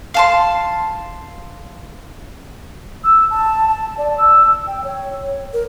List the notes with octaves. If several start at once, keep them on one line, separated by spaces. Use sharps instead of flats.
F5 A5 C6
E6
A5
A5
D5
E6
G5
C#5
A#4